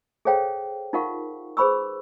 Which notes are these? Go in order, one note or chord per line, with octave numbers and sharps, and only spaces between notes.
G#4 A4 C5 C#5 F5 G5
D#4 F4 A#4 F5 F#5 C#6
G#4 B4 C5 B5 C#6 E6